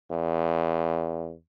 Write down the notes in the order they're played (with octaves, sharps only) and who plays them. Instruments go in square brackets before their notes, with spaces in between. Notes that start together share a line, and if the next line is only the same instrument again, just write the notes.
[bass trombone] E2